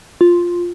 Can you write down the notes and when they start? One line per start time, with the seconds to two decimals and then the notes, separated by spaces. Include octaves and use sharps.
0.21 F4